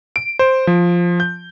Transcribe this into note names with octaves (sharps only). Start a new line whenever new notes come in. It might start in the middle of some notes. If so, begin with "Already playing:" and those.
D7
C5
F3
G6